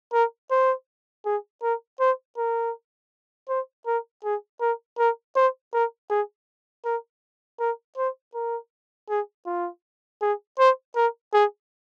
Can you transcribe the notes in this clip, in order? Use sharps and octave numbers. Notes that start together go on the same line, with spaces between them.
A#4
C5
G#4
A#4
C5
A#4
C5
A#4
G#4
A#4
A#4
C5
A#4
G#4
A#4
A#4
C5
A#4
G#4
F4
G#4
C5
A#4
G#4